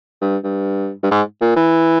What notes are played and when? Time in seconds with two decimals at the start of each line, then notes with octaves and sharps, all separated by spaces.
0.21 G2
0.44 G2
1.03 G2
1.11 G#2
1.41 A#2
1.56 E3